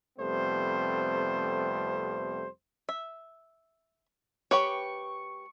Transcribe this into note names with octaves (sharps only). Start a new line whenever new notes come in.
F2 C3 G3 A3 B3 C5
E5
G4 B4 C#5 C#6